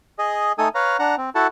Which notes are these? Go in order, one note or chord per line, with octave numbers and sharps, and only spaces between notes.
G#4 D#5
A3 D#4 A4 G#5 D#6
B4 C#5 F5 A#5
D4 F#5 A#5
C4
E4 F#4 A4 F#5 A5